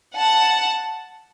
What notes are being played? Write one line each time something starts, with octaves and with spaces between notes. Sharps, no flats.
F#5 A5